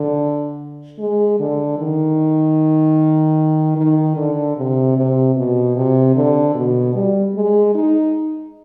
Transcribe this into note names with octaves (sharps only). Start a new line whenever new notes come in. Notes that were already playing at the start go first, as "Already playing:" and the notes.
Already playing: D3
G#3
D3
D#3
D#3
D3
C3
C3
B2
C3
D3
B2
G3
G#3
D#4